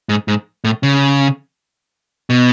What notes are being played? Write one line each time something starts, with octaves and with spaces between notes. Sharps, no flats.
G#2
G#2
A2
C#3
B2